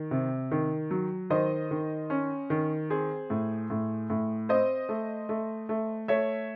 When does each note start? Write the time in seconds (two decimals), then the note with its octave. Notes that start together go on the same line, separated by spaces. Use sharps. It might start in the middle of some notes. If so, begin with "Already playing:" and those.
Already playing: D#3
0.11 C3
0.51 D#3
0.91 F#3
1.30 D#3 C5 D#5
1.71 D#3
2.10 C#4
2.50 D#3
2.90 C4 G#4 C5
3.30 A2
3.70 A2
4.10 A2
4.49 C4 C5 D#5
4.89 A3
5.29 A3
5.69 A3
6.08 A3 C#5 E5